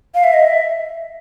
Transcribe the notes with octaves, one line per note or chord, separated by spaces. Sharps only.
F5
E5
D#5
E5